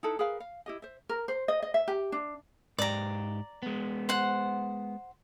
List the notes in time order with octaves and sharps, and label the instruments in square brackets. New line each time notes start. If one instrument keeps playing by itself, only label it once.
[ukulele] D#4 E4 A4 B4
G#4 A#4 B4 F5
F5
E4 G4 D#5
C5 E5
A#4
C5
D#5
D#5
E5
G4
D4
[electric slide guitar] G#2 G4 [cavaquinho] D5 A#5
[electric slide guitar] G#3 B3
[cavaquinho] C5 F#5